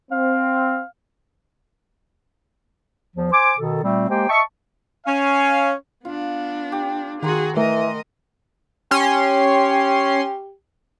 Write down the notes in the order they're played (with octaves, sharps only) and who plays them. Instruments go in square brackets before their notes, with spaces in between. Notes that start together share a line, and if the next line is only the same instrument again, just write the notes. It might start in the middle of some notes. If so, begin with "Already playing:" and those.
[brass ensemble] C4 [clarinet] F5
[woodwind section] E2 F3
C5 G#5 D6
B2 D#3 A4
A#2 G3 A3 C4
G#3 A#3 G4 C5 G5
D#5 E5 A5 C#6
[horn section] C#4 F5
[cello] B3 D4 [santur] F4
[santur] G4
[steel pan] D#3 [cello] F#4 G#4 [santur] F#5 A#5 C6
[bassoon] E3 [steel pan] A3 [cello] A#4 D#5
[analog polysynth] C#4 C6 [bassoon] G4